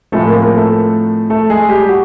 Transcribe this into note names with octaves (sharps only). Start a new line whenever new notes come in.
A2 F3 G#3 A3 C4 A4
A#3 A#4
A#3 A#4
A3 A4
A3 A4
G#3 G#4
G3 G4
F#4